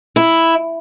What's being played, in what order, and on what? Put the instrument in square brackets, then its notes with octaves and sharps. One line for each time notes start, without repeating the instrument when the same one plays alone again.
[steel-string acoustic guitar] E4